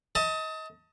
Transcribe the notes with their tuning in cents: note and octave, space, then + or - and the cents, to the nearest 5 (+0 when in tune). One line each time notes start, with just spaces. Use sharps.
D#5 +30 A5 +25